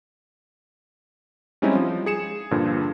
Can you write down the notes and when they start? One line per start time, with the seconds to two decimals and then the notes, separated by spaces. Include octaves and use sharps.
1.62 G3 G#3 C4 C#4 D#4 E4
1.75 F3
2.06 G#4 C#7 E7
2.51 G2 A#2 D3 F3